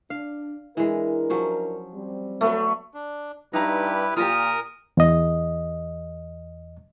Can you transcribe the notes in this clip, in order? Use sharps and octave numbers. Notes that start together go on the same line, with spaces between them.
D4 F5
E3 G#3 D4 E4 A#4
F3 F#3 C#4
G3 C4
F#3 A3 B3 D4
D4
G2 D#4 E4 G4 B4 A#5
A#2 F4 G4 A#4 G#5 A#5 D#6
E2 D#5